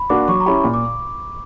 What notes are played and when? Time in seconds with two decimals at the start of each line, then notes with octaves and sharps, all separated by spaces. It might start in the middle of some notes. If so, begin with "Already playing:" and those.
Already playing: B5
0.10 A#3 D4 F#4 D6
0.28 F#3 C#6
0.40 A#5
0.46 C#4 E4 G4 B5
0.64 A#2
0.74 D6